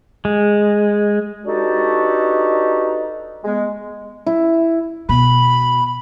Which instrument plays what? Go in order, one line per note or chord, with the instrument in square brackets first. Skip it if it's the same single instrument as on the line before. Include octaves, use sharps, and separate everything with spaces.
[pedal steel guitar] G#3
[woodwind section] D4 D#4 F#4 G4 A4 B4
G#3 B3
[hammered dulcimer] E4
[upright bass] B2 [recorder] B5